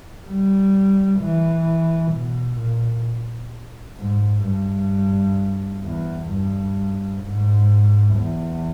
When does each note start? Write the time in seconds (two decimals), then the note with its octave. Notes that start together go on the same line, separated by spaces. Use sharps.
0.27 G3
1.20 E3
2.12 B2
2.59 A#2
3.97 G#2
4.44 G2
5.84 E2
6.30 G2
7.22 G#2
8.16 E2